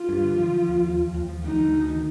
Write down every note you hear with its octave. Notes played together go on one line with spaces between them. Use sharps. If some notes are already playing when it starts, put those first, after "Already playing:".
Already playing: F4
G2
D3
F3
F3
D#2
F3
D#2
D#2
F3
D2 D#4
D2
D2
D#3